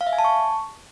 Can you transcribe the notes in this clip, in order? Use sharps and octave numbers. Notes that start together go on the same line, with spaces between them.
F5
E5
G#5
A5
C#6